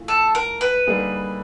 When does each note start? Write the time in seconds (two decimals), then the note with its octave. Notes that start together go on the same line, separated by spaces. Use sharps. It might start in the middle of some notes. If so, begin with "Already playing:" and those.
Already playing: E3 A3 F4
0.08 A4
0.35 A#4
0.61 B4
0.87 D3 G3 A#3 D#4 G#4